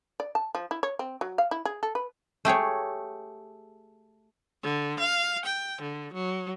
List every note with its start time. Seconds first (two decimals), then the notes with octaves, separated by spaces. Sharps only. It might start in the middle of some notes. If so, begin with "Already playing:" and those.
0.20 D5
0.35 A5
0.55 F3
0.71 E4
0.83 C#5
0.99 C4
1.21 F#3
1.38 F5
1.51 E4
1.65 G#4
1.83 A4
1.95 B4
2.45 A3 G4 G#4 C#5
4.63 D3
4.99 F5
5.45 G5
5.81 D3
6.13 F#3